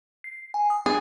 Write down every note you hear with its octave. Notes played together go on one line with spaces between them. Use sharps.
C7
G#5
D#6
B3 D4 G#4